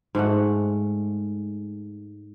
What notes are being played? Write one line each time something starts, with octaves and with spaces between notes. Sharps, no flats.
G#2 G#3 A3 F#5